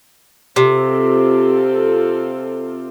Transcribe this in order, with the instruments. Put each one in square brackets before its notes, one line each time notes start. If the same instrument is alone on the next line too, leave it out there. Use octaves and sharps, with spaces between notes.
[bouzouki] C3 [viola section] C4 F4 A4